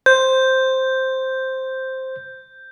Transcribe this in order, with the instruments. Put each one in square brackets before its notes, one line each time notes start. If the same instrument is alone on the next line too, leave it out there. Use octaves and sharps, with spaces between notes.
[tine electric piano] C5 [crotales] G6